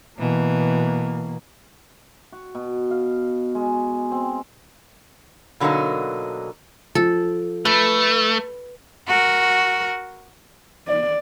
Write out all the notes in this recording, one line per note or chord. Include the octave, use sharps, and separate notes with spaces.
B2 E3 A#3
F#4
B2
F5
G#3
C4
B2 D3 F#3 A3 A#3 D#4
F3 A4
A3 B4
F#4 A#4
D5